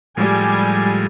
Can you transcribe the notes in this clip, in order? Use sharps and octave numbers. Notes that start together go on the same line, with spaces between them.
A2 F3 G3 G#3 G#5